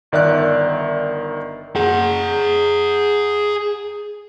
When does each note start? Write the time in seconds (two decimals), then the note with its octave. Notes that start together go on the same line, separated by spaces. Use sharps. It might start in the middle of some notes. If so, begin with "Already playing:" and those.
0.12 G1 D#3 D5 E5 F#6
1.76 G#4 F#5